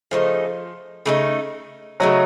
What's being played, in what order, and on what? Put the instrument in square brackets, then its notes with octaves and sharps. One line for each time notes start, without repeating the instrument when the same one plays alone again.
[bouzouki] C#3 A3 D#4 [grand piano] F3
[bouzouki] C#3 A3 D#4
[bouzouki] C#3 A3 D#4 [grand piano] F#3